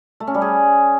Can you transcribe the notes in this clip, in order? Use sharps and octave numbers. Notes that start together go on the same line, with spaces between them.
A3
C#4
G3
G#4